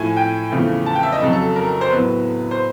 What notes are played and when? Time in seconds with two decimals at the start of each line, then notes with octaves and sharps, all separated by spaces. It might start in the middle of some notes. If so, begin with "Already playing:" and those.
Already playing: A2 F3 A3 G#5
0.17 G5
0.51 E2 C#3 F3 A3
0.86 A5
0.95 G5
1.03 E5
1.12 D#5
1.21 F2 C#3 F#3 A4
1.33 A4
1.56 A#4
1.81 C5
1.91 A2 F#3 B3 B4
2.51 C5